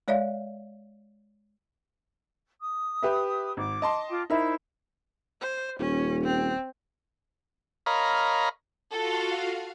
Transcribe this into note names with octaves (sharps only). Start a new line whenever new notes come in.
G#3 C#5 D5 E5 F5
D#6
G4 B4 E5
G#1 D6
D#5 A5 C6
F4 G5 D6
D#4 E4 A#4 C5 E5 B5
C5
D#1 C#4
C4
A#4 C#5 D#5 F5 A#5 B5
F4 F#4 A4 F5